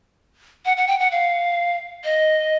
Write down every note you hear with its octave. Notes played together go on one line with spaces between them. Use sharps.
F#5
F#5
G5
F#5
F5
D#5